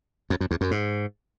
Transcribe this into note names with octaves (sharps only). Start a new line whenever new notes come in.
F2
F#2
E2
F#2
G#2